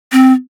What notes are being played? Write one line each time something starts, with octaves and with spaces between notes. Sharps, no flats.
C4